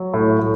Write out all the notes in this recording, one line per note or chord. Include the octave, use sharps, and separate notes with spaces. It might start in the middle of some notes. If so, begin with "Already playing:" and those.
Already playing: F#3
A2
A2